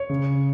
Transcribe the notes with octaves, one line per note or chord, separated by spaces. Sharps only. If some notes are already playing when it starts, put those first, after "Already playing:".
Already playing: C#5
C#3